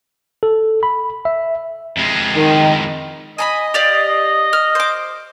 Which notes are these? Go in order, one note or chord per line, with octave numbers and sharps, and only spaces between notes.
A4
B5
E5
F2 G#3
D#3
D#5 G#5 A#5 B5
G4 D5 F5
F6
C5 D6